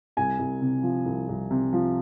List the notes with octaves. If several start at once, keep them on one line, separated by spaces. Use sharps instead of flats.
C2 G#5
C2
C3
F3
C2
C2
C3
F3